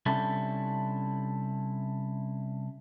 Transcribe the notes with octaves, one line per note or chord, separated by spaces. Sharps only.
C3 G3 C#4 D4 E4 A4